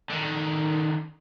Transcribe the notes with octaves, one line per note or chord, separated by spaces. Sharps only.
D3 D#3